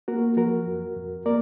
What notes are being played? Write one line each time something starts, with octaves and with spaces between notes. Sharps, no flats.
A#3 F#4 A#4
F3 F#4 A#4
F2
F2
A#3 A#4 D5